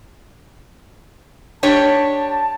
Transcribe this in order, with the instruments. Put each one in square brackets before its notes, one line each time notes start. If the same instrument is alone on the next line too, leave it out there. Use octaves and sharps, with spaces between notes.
[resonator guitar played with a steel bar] D4 G4 C#5 [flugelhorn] A5